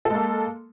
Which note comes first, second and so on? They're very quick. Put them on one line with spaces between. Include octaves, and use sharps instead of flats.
A4 G#3 A#3